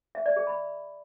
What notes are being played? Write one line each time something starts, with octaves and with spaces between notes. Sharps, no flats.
E5
D5
G#4
B5